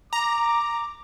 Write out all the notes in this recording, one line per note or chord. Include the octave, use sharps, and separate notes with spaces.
A#5 D6